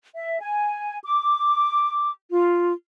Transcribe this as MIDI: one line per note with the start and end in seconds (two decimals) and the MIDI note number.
0.15 0.40 76
0.40 0.98 80
1.04 2.11 86
2.32 2.71 65